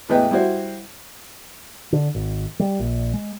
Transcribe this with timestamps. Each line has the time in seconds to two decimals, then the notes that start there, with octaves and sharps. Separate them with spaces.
0.09 A1 E2 G#3 B4 D#5 G5
0.31 G3 E4 F#4 C5
1.92 D3
2.15 G#1
2.60 G3
2.79 A#1
3.14 G#3